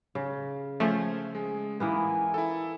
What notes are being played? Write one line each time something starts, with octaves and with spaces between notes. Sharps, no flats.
C#3
F3 A3 C#4 C5 G#5
G#3 G#4
E3 A#3 B3 G#5
E4 A4